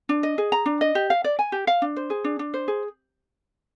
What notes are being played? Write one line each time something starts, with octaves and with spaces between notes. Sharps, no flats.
D4
D#5
G#4
A#5
D4
D#5
G4
F5
D5
G#5
G4
F5
D4
C5
G#4
D4
D4
C5
G#4